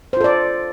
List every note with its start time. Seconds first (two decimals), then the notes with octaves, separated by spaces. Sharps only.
0.13 C5
0.17 F4
0.21 A4
0.24 D5